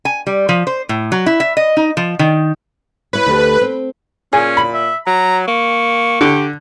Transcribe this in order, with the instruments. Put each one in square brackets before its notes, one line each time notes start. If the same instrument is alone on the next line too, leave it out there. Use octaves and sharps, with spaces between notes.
[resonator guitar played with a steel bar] G#5
G3
F3
C5
A2
F#3
E4
E5
D#5
D#4
F3
D#3
[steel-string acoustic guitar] E4 C#5 [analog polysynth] B4
[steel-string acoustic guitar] D2 A3 G4
C4
[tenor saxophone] A#2 [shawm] C#4 [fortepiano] G#4
[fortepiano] B5
[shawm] E5
[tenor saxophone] F#3 [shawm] A#5
[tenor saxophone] A#3 [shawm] C#6
[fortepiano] D3 [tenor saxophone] G4